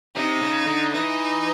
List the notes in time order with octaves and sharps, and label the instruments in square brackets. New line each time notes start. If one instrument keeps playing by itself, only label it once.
[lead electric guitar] C3 [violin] D#4
[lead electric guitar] C#3
D3
[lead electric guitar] E3 [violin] D#4